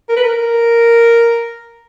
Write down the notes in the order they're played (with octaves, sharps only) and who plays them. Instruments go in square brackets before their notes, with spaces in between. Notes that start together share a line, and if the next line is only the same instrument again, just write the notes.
[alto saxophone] A#4
B4
A#4